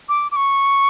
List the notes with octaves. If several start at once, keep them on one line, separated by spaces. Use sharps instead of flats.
D6
D6
C#6